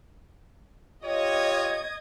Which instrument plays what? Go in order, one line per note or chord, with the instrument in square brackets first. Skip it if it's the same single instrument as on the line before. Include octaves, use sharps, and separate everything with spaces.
[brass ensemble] F4 G4 C#5 [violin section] D#5 D#6 G#6